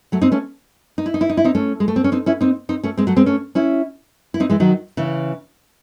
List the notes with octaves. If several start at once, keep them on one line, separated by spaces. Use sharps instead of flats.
F#3 A3
C4 D#4
A3 C#4
D#4
E4
D#4
E4
D#4
E4
C4 D#4
A3 C#4
G#3
A3
C4
C#4
C4 D#4
C#4 E4
C4 D#4
C4 D#4
A3 C#4
G#3 C4
F#3 A3
G#3 C4
A3 C#4
C#4 E4
E4
C4 D#4
E3 G#3
D#3 F#3
C#3 E3